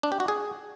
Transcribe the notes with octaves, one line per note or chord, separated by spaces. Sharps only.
D4
G4
F#4
G#4